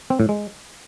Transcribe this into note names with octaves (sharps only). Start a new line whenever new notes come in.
C4
A2
G#3